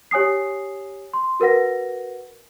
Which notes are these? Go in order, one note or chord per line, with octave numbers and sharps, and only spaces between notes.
G4 C#5 G#5 D#6 C7
C6
F#4 A#4 B4 F#5 A#6